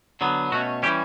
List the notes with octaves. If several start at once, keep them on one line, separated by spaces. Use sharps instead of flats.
D3 F#3 B3
B2 A3 C#4 F#4
E3 G3 C#4 G4